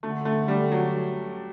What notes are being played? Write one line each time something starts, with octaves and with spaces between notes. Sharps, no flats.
D3 A3
A3
G3
F#3